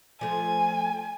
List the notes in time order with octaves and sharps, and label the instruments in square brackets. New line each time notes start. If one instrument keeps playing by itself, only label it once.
[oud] F3 A3 [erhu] G#5